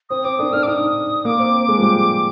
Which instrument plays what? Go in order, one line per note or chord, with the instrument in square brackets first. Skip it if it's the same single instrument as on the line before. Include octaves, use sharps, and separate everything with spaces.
[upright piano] C4 [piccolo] D#6
[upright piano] C4 [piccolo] D6
[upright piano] D4 [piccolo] D#6
[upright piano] D4 [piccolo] F6
[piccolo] D6
[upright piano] D#4 [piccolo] D#6
[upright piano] A#3 [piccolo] D6
[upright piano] C4
C4
G#3
F3
G3